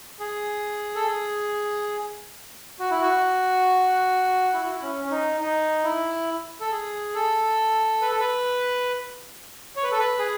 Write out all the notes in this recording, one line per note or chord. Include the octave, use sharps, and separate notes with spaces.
G#4
A4
G#4
F#4
E4
F#4
E4
F#4
E4
C#4
C#4
D#4
D#4
E4
A4
G#4
A4
B4
A4
B4
C#5
B4
A4
B4
G#4